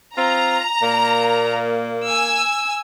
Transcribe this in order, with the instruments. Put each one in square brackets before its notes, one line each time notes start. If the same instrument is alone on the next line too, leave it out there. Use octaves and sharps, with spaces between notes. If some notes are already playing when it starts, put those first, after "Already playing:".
[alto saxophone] C4 [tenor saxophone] F4 [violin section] A#5
[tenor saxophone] A#2 [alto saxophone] A#3
[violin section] G#5 E6